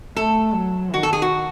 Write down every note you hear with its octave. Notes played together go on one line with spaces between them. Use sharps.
A3 A4
F#3
D#3 F#4
A4
G#4
F#4